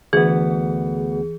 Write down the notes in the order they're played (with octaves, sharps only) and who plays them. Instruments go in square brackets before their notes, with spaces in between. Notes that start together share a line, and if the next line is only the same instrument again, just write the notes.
[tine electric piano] D2 B3 [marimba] E3 [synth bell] G#4